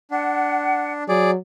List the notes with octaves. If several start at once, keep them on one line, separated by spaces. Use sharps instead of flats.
D4 F#5
F#3 G#4 D5